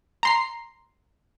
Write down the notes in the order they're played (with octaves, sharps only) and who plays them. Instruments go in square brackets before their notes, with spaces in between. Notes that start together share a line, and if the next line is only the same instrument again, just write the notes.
[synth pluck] A#5 C6 C7